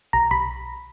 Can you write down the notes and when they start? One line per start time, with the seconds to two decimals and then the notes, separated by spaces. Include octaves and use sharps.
0.13 B1 A#5
0.31 B1 B5